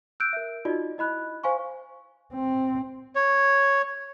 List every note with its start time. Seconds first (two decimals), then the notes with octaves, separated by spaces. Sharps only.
0.20 E6 F#6 G6 D7
0.33 A#4 E5
0.65 D#4 F4 F#4 D5 D#5
0.98 E4 D#5 B5 F#6
1.44 C5 F5 G#5 C6 C#6
2.34 C4
3.15 C#5